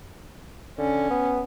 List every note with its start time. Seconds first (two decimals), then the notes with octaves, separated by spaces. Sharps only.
0.78 D3 C#4
1.10 B3